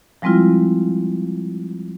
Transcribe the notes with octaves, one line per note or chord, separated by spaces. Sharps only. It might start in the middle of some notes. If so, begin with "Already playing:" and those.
F3 G3 G#3 C4 E4 F4